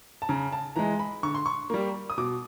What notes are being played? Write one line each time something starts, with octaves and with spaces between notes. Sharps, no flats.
A5
C#3 A#5
A5
E3 G#3 A#5
B5
D3 C#6
C6
C#6
G3 A#3
D#6
B2 D6